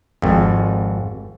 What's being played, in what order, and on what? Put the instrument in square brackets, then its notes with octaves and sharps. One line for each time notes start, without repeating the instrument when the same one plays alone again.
[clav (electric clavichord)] G#1 F2